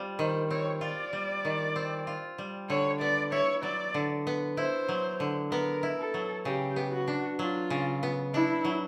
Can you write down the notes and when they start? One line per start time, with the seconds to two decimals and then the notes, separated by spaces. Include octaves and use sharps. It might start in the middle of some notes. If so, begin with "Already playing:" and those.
Already playing: G3 C4 F4
0.19 D#3 C5
0.50 C4 C#5
0.81 F4 D5
1.13 G3
1.45 D#3
1.76 C4
2.07 F4
2.38 G3
2.69 D3 C#5
3.00 B3 D5
3.32 E4 C#5
3.63 F#3 D5
3.94 D3
4.27 B3
4.57 E4 C5
4.89 F#3
5.20 D3
5.52 B3 A#4
5.83 E4
5.99 A4
6.14 F#3
6.45 C#3 G4
6.76 B3
6.92 F#4
7.08 D4
7.39 F#3 F4
7.70 C#3
8.03 B3
8.34 D4 E4
8.65 F#3